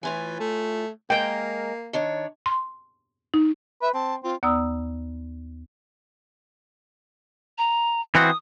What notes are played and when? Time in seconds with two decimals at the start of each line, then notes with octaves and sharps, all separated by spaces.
0.03 A2 E3 F4 G#5
0.40 A3
1.10 G#3 A#3 A#4 G5
1.93 D#3 D4 C#5
2.46 C6
3.34 D#4
3.82 B4 E5
3.94 C4 A5
4.24 C4 F4
4.43 D#2 B3 D5 A#5 D#6 E6
7.58 A#5
8.15 E3 C4 F#4 D#6